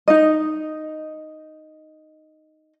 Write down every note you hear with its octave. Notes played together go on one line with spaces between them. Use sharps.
D#4 D#5